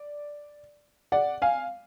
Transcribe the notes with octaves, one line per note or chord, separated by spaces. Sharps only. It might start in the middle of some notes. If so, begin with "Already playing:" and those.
Already playing: D5
D5 F#5
F5 G#5